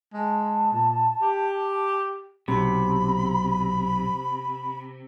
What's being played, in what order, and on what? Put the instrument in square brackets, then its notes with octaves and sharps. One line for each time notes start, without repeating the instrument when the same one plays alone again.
[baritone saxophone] G#3 [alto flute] A5
[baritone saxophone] A#2
G4
[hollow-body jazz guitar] B1 [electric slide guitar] C3 [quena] B5